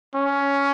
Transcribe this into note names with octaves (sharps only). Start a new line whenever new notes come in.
C#4